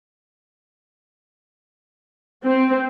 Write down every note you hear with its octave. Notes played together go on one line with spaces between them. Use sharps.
C4